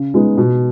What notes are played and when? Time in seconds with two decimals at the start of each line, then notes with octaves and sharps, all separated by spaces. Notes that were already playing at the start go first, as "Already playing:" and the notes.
Already playing: C#3
0.14 G#3 B3 D#4
0.38 B2